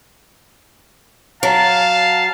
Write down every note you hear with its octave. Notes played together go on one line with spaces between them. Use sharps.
F#3 F5 A5